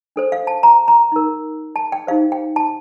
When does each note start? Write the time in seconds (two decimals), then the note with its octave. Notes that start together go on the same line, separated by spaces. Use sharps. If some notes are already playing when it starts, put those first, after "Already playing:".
0.16 D4 A4 C5
0.32 F5
0.47 A5
0.63 A#5
0.88 A#5
1.12 D#4 A#4
1.76 A5
1.92 G5
2.07 D#4 G4 C5 F5
2.32 G5
2.56 A5